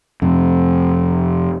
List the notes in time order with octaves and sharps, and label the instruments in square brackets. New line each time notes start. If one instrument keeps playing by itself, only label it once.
[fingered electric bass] F2 C3